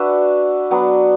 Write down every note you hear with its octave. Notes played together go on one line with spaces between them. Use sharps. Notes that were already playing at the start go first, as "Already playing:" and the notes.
Already playing: D4 F#4 B4 E5
F#3 B3 D4